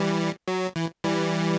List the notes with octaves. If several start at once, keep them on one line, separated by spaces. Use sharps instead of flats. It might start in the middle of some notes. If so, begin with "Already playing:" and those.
Already playing: E3 G3
F#3
E3
E3 G3